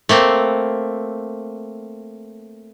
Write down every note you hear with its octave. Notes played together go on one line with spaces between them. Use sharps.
A3 A#3 C4